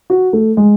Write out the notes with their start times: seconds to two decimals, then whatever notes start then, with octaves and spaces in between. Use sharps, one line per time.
0.10 F#4
0.33 A3
0.57 G#3